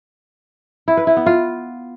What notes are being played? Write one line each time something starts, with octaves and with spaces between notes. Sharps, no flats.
E4
B4
E4
B3
F4